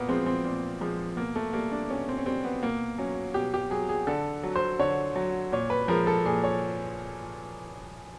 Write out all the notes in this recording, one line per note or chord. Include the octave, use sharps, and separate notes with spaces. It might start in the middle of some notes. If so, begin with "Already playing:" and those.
Already playing: A#2 A#3 B3
F3 G#3 C4
C4
A#2
F3 G#3
B2 A#3
A3
G3 A#3
D4
B2 C#4
C4
C#4
G3 C4
B3
B2 A#3
F#3 C#4
B2 G4
G4
F#3 G#4
G#4
D3 A4
F#3
C5
D3 C#5
F#3
A#2 C#5
B4
F3 G#3 A#4
A4
A#2 G#4
C#5